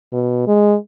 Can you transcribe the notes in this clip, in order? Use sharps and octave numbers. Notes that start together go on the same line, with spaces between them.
B2
G#3